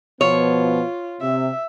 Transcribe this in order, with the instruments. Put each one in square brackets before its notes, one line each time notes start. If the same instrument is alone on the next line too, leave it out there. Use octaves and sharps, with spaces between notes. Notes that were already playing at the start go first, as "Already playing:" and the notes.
[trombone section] B2 F3 B3 [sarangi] F4 [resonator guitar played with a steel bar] C#5
[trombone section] C3 [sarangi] E5